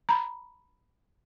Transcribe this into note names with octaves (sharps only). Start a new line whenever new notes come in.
A#5 B5